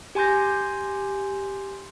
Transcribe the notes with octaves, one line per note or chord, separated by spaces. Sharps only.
G4 G#5 C6 G6 A#6